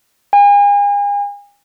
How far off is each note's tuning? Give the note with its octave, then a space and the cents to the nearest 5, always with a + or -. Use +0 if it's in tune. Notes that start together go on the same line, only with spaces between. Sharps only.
G#5 -40